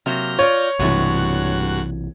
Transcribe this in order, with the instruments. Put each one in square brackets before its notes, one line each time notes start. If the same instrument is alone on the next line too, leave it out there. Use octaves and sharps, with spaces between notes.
[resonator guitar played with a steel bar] C3 F#3 A#3 [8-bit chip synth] F6 G6 A#6
[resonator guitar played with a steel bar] F4 D5 [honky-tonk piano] C#5
[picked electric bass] B1 C3 E3 [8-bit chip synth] G2 F#4 F#6 [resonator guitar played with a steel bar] G#3 A3